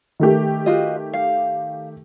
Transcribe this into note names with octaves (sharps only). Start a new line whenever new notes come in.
D#3 A3 G4
F4 F#4 D#5
F5